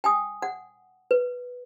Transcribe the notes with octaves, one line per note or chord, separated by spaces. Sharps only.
G5 G#5 D#6
F#5
B4